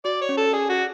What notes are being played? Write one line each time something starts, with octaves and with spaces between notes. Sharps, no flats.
F#4 D5
C#5
C#4
A4
G#4 D5
F#4
G#4